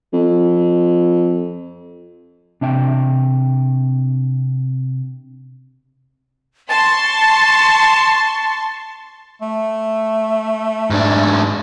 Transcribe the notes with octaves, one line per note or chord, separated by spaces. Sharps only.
F2
C3 D4 E5 G5
A5 C6 C#6 A6
A3
G#2 D4